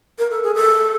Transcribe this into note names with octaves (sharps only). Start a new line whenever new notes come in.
A#4
A4
G#4
A4